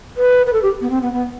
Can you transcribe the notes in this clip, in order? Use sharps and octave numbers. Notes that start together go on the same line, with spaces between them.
B4
B4
A4
G4
B3
C4
B3
B3